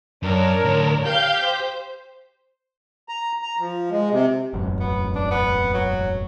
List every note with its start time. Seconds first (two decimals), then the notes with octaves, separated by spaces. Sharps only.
0.23 F#2 D4 A#4 C#5
0.65 A2 D3
1.06 G4 F5 G6
1.45 C5
3.09 A#5
3.42 A#5
3.60 F3
3.90 G#3
4.12 C3
4.53 E1 A1 F#2
4.80 B3
5.16 D4
5.31 B3
5.74 F#3